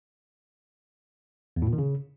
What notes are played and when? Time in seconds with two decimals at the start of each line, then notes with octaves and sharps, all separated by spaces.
1.56 E2
1.62 A2
1.67 A#2
1.73 D#3
1.78 C#3